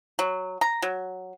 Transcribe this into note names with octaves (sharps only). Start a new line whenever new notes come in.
F#3
A#5
F#3